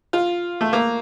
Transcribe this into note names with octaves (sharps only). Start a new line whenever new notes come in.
F4
A3
A#3